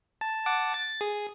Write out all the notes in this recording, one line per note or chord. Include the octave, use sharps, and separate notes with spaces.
A5
F#5 A5 D6
A6
G#4